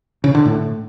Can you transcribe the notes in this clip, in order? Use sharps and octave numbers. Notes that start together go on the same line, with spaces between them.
C#3
D3
A2